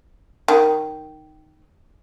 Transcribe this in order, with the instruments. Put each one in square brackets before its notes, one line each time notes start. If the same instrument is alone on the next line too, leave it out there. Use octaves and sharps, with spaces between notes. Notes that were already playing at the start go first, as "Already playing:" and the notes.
[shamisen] D#3